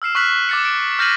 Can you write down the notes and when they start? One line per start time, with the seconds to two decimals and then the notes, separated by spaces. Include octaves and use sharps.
0.02 E6 F6 C7 E7
0.15 C#6 F6 F#6 B6 F#7
0.49 D6 A6 C#7
0.65 D7
0.99 F6 G6 A#6 B6 D#7 F#7